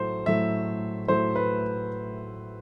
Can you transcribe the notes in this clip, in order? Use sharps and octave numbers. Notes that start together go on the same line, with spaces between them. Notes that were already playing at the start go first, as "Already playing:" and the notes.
Already playing: A2 F#3 A3 C5
A2 F#3 A3 E5
A2 F#3 A3 C5
B4